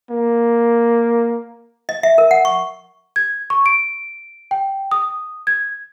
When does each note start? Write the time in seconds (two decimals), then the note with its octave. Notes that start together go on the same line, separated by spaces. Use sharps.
0.11 A#3
1.89 D#5
2.03 E5
2.18 A#4
2.31 F#5
2.45 C#6
3.16 G#6
3.50 C#6
3.66 D7
4.51 G5
4.91 D#6
5.47 G#6